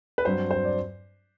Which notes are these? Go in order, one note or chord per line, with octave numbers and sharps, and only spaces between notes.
B4
G2 F#3 C4 C5
C5
D5